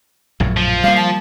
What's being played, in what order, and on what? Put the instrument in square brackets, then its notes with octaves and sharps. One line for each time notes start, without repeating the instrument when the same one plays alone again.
[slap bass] A#1 F#2 A2
[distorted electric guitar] F3
[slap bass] G3 A#3 [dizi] F5
[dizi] A5